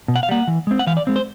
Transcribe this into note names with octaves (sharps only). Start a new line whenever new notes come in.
B2
F#5
F5
G3 A#3 F#5
E3
G#3 C4
F#5
E3 F5
D5
G#3 C4
C5